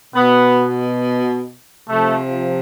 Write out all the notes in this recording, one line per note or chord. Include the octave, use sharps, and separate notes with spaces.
B2 B3
C3 F3 A3